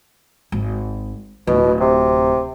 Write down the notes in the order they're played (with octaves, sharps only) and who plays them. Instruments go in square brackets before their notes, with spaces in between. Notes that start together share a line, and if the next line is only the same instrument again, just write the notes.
[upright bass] G#1
[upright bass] D1 E4 [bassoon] B2
[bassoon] C3